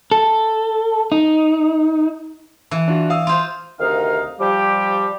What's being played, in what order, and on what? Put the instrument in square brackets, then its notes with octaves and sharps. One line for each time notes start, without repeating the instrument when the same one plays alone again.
[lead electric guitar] A4
D#4
[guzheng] E3
[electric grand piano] D4 F4 F#4
F5 D#6 E6
[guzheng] F4 C5
[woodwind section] D2 C3 D#3 D#4 F5
F3 G3 G4